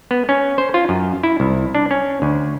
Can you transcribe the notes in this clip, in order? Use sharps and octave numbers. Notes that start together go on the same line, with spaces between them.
B3
C#4
C5
F4
F#2
E4
C2
D4
C#4
D2